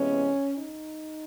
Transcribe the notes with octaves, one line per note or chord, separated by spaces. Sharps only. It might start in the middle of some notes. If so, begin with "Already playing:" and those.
Already playing: C3 E3 G#3 B3 C#4
D#4